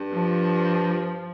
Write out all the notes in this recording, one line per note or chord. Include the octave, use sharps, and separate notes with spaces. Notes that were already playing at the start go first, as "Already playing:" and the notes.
Already playing: G2
F3